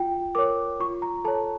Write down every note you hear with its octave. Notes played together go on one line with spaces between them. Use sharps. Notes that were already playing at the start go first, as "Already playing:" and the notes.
Already playing: F4 G5
A#4 C#5 D6
F4 C#6
A#5
A4 C#5 A5